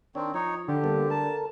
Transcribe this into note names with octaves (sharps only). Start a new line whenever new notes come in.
D#3 C4 D4 C#5
F3 D#4 C#5
D3 G4
G3 A#3 B3
A4 A#4 A5